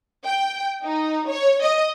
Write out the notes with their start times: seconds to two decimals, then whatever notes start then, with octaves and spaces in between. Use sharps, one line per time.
0.25 G5
0.84 D#4
1.28 C#5
1.62 D#5